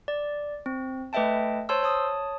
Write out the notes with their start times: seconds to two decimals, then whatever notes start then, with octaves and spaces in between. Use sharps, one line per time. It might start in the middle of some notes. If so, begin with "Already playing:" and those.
0.08 D5
0.66 C4
1.13 A3 B4 D#5 E5 G5 A5
1.69 C5 C#5 A5 C6 E6
1.83 C#5 A5 D#6